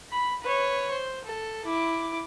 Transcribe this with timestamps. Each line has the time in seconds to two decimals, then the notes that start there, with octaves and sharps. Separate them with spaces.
0.12 B5
0.42 B4 C#5
0.91 C5
1.25 A4
1.66 E4 D6